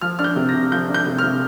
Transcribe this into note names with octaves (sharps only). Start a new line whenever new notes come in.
F3 F6
D4 F6
G6
C3
A#6
C3
F3 G6
D4
G6
C3
F6
C3